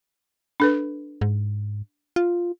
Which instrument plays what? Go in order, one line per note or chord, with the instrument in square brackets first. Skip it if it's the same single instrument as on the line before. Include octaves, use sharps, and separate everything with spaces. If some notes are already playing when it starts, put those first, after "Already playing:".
[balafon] D4 A4 B4
[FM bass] G#2
F4